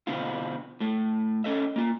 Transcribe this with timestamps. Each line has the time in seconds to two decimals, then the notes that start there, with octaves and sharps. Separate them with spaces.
0.07 B2 D3 B3 C4 E4 F4
0.80 A2 A3
1.44 C#4 A4 D#5 E5
1.76 A#3 F4